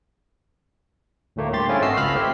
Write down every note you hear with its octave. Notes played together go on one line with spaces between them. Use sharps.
D2 A2 A3 A#3
G2 G4 C6 A6
C4 C#4 E4 F4 G#4
G#1 A3 F#4 D#5 E6 C7
C#2 F5 B5 F6 B6
C4 E4 G4